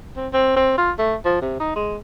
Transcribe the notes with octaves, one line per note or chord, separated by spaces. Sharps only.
C4
C4
C4
F4
A3
F3
C3
D#4
G#3